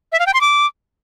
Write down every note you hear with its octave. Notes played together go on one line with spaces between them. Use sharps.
E5
F5
G5
C6
D6